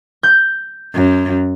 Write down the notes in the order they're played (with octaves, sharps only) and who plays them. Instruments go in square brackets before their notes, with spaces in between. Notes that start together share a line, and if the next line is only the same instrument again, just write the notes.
[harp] G6
[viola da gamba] F#2